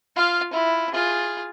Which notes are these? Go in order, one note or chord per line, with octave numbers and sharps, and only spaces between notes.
F4 F5
E4 F4
F4 G#4